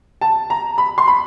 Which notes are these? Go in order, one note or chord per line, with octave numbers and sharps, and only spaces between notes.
A5
A#5
B5
C6
B5